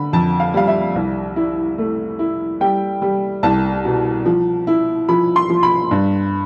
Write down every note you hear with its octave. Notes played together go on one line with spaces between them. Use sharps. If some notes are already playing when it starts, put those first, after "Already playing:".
Already playing: D3 B5
F2 A5
F5
G3 F5
E5
C2
E4
A3
E4
G3 G5
G3
C2 A5
B2
F3
E4
F3 B5
C6
F3
B5
G2